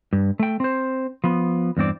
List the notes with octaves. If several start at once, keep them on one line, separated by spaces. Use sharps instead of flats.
G2
A3 G5
C4 C5
F3 B3
E2 G2 C4 D5